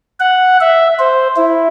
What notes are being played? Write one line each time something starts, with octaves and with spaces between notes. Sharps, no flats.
F#5
E5
C5
E4